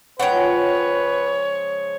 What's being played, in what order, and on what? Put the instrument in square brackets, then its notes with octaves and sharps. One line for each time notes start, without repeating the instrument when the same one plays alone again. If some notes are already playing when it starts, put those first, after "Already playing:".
[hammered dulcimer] C#3 F3 G#3 [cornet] B4 [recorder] C#5 [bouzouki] F#5 G5